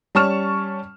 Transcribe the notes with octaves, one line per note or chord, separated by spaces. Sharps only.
G3 C#4 A5 C#6 F6 E7